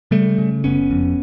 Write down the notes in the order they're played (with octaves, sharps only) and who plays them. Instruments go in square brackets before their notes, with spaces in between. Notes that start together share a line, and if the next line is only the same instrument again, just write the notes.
[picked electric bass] C#3 G3 A3
C#3
F#1 B3 C#4
F2